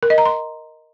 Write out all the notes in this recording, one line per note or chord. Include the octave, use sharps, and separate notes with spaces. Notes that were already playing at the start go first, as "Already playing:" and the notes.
A#4
D#5
A#5
C6